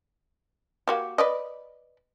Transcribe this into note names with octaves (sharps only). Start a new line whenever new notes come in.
A#3 F#4 G4
B4 D5 D#5